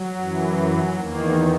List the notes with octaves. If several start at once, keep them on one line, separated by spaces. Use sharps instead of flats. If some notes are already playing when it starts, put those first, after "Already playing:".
Already playing: F#3
F#2 E3
E2 D#3 A#3